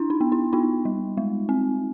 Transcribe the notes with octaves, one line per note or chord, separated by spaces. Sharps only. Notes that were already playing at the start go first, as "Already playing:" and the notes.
Already playing: D4 E4
D#4
B3
E4
B3 D#4 F4
G3
G#3
C4